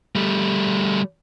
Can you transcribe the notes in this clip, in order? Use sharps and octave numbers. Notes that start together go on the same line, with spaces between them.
G3 A3